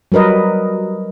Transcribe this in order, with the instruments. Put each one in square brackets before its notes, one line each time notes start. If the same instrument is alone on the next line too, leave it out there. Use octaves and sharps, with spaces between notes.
[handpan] F#3 G3 A#4 B4 D#5